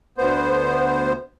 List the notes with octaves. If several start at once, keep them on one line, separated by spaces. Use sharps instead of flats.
D2 B3 C5